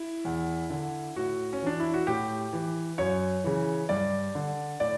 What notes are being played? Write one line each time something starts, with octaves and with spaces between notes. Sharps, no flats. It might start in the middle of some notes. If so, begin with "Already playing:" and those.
Already playing: E4
E2
D3
A2 F#4
C#4
E3 D4
E4
F#4
A2 G4
E3
F#2 C#5
C#3 E3
G2 D5
D3
A2 D5